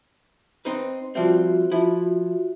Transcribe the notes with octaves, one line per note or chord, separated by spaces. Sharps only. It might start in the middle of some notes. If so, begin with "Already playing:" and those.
C4 D#4 B4
F3 G3 C4 F4 F#4 E5
F3 E4